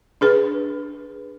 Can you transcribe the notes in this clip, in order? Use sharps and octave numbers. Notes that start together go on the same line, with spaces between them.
D4 G#4 B4